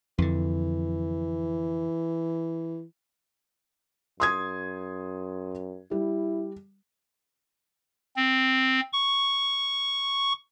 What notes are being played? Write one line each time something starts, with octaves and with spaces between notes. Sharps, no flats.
F2 D3 E3
F#2 C6 D#6 G#6
G3 E4
C4
C#6